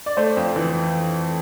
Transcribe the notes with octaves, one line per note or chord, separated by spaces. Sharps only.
D5
A3 C5
F2
E3